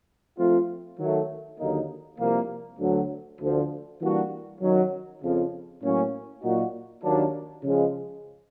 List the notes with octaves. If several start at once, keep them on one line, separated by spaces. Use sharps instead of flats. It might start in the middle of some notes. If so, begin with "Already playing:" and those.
F3 A3 C4 F4
D#3 F#3 A3
D#2 D3 F#3 A#3 D#4
C2 C3 F3 A#3
D2 D3 F#3
D2 D3 F3
E3 G3 A#3 D4 F#4
F#2 D#3 F#3
F2 C#3 F3
A2 F#3 A#3 C#4
A#2 F#3 A#3 D#4 F#4
D#2 D#3 F#3 A#3 D4
C#3 F3 G#3